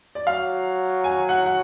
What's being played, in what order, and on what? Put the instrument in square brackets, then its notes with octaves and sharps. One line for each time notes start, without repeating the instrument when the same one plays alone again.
[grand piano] D5
[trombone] F#3 [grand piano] F5
[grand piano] G#5
F#5
F#5